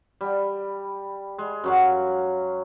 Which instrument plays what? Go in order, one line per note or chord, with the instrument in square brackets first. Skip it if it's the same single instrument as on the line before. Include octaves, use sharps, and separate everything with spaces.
[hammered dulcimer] G3
G#3
F#2 F#3 F5